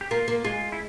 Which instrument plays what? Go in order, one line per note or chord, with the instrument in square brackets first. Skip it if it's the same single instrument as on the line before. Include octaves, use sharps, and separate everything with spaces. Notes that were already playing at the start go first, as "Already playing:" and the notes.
[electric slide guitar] G4
[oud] A#3 [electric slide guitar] F4
[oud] A#3
[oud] G#3 [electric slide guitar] F4
[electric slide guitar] E4